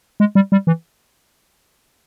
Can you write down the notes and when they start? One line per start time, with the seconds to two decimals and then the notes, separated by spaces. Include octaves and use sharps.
0.20 G#3
0.35 G3
0.52 G3
0.67 E3